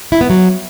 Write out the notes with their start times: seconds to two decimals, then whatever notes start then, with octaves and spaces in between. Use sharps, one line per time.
0.12 E4
0.21 B3
0.30 F#3